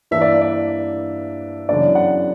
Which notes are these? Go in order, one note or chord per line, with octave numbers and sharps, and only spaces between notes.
G2 E3 A#3 D4 E5
D5
D5
F#2 C#3 E3 B3 D4 D5
F#5